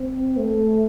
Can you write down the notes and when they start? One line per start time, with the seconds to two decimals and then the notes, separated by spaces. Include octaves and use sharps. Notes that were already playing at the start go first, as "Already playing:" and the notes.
Already playing: C4
0.37 A3